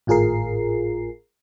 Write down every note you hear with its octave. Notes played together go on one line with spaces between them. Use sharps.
G#1 A2 F4 G#4 A#4 C7